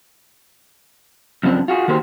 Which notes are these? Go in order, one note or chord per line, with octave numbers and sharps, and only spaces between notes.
F#2 C#3 F3 G#3 C4 D4
F4 F#4 G#4
D#3 A#3 F#4 G4 C5